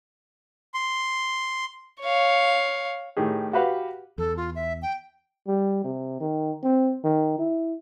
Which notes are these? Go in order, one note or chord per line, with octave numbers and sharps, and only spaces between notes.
C6
C#5 F5
A2 D#3 G4 G#4
F#4 G4 B4 F5 F#5
E2 A4
F4
E5
G5
G3
C3
D#3
C4
D#3
E4